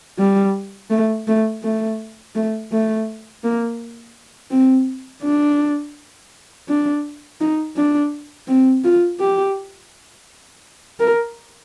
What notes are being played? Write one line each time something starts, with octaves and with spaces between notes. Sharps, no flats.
G3
A3
A3
A3
A3
A3
A#3
C4
D4
D4
D#4
D4
C4
F4
G4
A#4